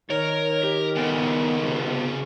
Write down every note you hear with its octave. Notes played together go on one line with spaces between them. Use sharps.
D#3 A#4 C#5
G4
C#3 B3 G4 A4 G#5
C3 B3